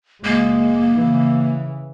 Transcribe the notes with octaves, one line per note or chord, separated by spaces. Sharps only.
F#1 G#3 A#3
C#3 E3